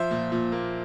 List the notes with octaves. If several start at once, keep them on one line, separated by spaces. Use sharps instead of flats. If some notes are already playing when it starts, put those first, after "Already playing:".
Already playing: F3 C5 E5
A#2
A#2
A#3